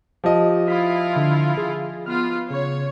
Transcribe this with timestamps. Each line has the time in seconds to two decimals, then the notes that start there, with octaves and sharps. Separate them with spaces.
0.24 F3 G4 D#5
0.68 E4 F4 B6
1.16 D3
1.57 G#4
2.06 B3 F4 F6
2.50 C#3 C#5